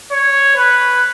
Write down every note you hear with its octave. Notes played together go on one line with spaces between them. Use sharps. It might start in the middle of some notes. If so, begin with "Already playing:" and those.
C#5
B4